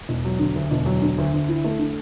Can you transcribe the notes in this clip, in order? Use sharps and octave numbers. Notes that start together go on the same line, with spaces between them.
E1
F#3
D3
D2
E1
F#3
D3
D2
D2
E4
A3
D3